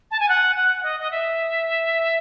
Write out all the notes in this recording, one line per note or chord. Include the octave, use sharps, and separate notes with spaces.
A5
G#5
F#5
F#5
D#5
D#5
E5